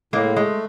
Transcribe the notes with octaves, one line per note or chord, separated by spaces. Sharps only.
A2 G#3 A#3
G#3 A3